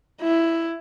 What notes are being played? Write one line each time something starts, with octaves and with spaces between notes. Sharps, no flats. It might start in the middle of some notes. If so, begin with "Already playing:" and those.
E4